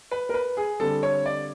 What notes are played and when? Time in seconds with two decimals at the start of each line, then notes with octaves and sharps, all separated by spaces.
0.11 B4
0.29 A#4
0.34 B4
0.57 G#4
0.80 D3 G3 C4 A4
1.03 C#5
1.26 D5